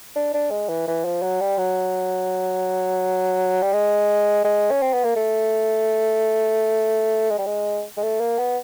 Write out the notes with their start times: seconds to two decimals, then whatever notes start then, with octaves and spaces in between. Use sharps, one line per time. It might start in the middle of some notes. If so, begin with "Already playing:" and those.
0.16 D4
0.34 D4
0.51 G#3
0.69 E3
0.87 E3
1.05 F3
1.22 F#3
1.41 G3
1.58 F#3
3.62 G3
3.73 G#3
4.44 G#3
4.71 C#4
4.82 C4
4.93 B3
5.04 A#3
5.16 A3
7.31 G#3
7.38 G3
7.46 G#3
7.97 G#3
8.03 A3
8.20 A#3
8.39 B3